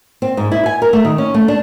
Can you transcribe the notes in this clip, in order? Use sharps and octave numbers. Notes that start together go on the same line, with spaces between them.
C4
G#2
E4
G#5
A#4
A3
D#3
C#4
A3
D4